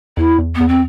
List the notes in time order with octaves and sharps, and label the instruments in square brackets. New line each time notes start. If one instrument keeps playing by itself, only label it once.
[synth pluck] E2 [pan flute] E4
[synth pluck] E2
[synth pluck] E2 [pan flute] B3
[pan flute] C4